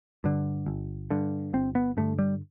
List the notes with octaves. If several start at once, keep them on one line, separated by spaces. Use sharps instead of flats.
G2 D3
G1
G2 D3
G1 C4
B3
G2 D3 A3
G3